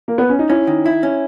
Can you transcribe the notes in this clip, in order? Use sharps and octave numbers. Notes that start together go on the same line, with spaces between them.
A#3
B3
C#4
D#4
C#4 E4
D#3
E4
C#4